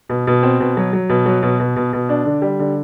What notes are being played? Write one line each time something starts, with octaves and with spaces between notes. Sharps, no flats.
B2
B2
C4
B2
F#3
F#3
B2
F#3
B2
B2
B2
B2
D4
D3
G3
D3